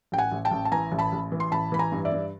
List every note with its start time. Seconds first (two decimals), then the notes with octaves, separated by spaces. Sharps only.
0.12 A1 G5
0.18 F#5 G#5
0.32 A1
0.45 G5 A5
0.51 A1
0.65 A5
0.72 E3 G#5 A#5
0.92 A1
0.99 A5 B5
1.12 A1
1.32 E3
1.40 C6
1.52 A1 A5 B5
1.72 E3 B5
1.79 G#5 A#5
1.92 G2
2.05 D5 E5
2.12 G2